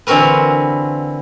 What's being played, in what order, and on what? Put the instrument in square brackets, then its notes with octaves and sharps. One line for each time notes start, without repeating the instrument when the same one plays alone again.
[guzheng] D3 E3 C4 F#4 A#4 B4